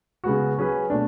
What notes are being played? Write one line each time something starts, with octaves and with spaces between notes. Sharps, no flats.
C#3 G#3 B3 F#4
F#3 C#4 G#4 B4
B2 A3 D4